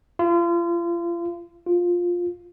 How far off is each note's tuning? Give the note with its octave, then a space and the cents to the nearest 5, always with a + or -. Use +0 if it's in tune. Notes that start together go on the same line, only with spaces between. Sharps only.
F4 -35
F4 +10